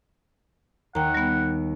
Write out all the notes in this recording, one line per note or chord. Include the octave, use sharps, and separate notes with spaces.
D#2 F#5 G5 A#5
G3 B3